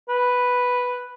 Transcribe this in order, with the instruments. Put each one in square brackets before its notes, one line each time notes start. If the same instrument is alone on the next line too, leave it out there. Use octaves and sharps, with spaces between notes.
[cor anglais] B4